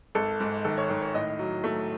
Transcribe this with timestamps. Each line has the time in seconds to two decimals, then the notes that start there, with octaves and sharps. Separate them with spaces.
0.15 G#1 A4
0.40 G#2
0.65 D#3 A4
0.78 C#5
0.90 D#3
1.02 C#5
1.15 A2 D#5
1.39 F#3
1.64 A3